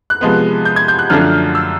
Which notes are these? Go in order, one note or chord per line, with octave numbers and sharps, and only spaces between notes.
F#6
C3 F3 G#3 B3
G6
G#6
G6
F#6
F#2 D3 F3 A3 D4 F6
E6